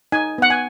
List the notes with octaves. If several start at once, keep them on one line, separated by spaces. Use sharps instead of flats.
D#4 G#5
B3 F#5
G#5